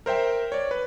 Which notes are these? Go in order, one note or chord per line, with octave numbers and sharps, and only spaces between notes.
A#4 C5 E5 G5
C#5 D5
B4